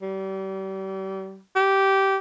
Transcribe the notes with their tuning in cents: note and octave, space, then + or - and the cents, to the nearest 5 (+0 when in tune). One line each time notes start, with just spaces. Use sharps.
G3 -35
G4 -15